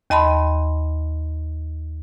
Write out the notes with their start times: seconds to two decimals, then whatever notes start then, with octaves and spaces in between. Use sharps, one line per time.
0.10 D#2 D#5 A5 B5 C6